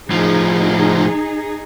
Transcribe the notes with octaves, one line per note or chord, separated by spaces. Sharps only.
A2 F3 D#4 G#4